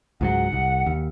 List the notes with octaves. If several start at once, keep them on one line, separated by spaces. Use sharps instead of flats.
C#2 G#2 F#3 F#5
C2
D#2